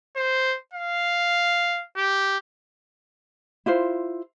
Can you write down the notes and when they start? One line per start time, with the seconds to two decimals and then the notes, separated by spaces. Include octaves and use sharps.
0.16 C5
0.74 F5
1.97 G4
3.66 E4 F4 C5